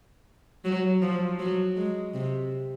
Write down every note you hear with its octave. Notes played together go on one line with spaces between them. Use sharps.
F#3
F3
F#3
G#3
C3